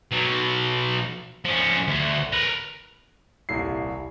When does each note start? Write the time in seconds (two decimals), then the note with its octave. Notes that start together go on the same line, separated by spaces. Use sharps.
0.11 B2 F#3
1.45 F3 C#4
1.87 D2
2.33 A#4 B4
3.49 D#1 C2 E4 C7